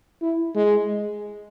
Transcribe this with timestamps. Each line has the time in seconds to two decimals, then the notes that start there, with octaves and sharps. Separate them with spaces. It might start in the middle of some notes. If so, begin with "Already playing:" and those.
0.22 E4
0.55 G#3